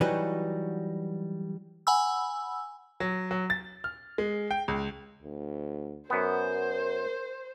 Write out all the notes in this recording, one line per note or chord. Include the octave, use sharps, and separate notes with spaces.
E3 F#3 G3 D#4 F#4 B4
F#5 G#5 B5 E6
F#3
F#3
A6
F6
G#3
G5
C#2
D2
F#2 B3 A#4 C5